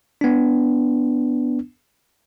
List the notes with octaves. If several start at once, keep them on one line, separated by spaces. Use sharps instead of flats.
B3 D4